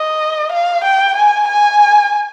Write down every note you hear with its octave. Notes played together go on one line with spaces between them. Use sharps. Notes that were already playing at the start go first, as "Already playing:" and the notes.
Already playing: D#5
F5
G5
G#5
G#5